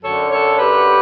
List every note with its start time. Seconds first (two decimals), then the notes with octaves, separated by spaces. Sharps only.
0.03 F#2 D3 F#3 A4 C#5
0.31 A4 C#5
0.58 G4 B4